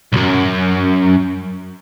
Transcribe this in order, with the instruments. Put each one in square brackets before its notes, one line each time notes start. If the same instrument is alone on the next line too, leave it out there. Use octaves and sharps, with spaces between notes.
[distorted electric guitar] B1 F#2